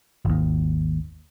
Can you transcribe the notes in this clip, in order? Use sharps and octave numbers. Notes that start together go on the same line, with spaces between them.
G#1 D#2